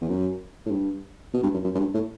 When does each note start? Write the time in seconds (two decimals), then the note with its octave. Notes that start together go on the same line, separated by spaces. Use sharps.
0.01 E2
0.09 F#2
0.66 A2
0.71 G2
1.33 B2
1.43 G2
1.54 F#2
1.64 F#2
1.75 F#2
1.79 G2
1.94 A2